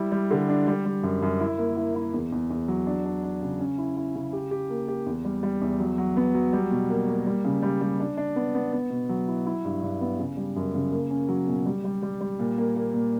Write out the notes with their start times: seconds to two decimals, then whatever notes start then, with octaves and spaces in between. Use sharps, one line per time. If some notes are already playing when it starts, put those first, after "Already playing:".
Already playing: G3 E4
0.12 G3
0.31 D3
0.49 D4
0.67 G3
0.85 G3
1.03 F#2
1.22 F#2
1.40 E4
1.58 A#3
1.77 E4
1.95 E4
2.13 E2
2.32 E2
2.50 E2
2.68 F#3
2.86 D4
3.05 D4
3.23 D4
3.42 C#3
3.60 C#4
3.78 E4
3.97 E4
4.15 C#3
4.33 G4
4.51 G4
4.70 A#3
4.88 G4
5.06 E2
5.25 G3
5.43 G3
5.61 E2
5.80 F#3
5.98 F#3
6.17 B3
6.35 F#3
6.53 G3
6.71 B2
6.90 A#3
7.08 A#3
7.27 G3
7.44 C#3
7.62 G3
7.81 G3
8.00 D4
8.17 D4
8.36 B3
8.55 B3
8.73 B3
8.90 B2
9.09 F#3
9.28 E4
9.46 E4
9.64 G2
9.83 G2
10.01 B3
10.19 C#3
10.37 G3
10.56 F#2
10.75 C#3
10.92 A#3
11.11 C#4
11.28 F#3
11.48 B2
11.66 G3
11.84 G3
12.03 G3
12.21 G3
12.39 A#2
12.58 A#3
12.76 A#3
12.94 A#2